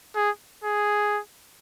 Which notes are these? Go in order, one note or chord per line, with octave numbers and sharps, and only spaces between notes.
G#4
G#4